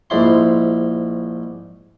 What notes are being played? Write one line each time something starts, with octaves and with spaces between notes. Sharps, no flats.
A#1 G#2 E4 C6